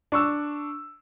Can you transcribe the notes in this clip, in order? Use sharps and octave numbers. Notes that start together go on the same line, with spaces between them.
D4 C#6 E6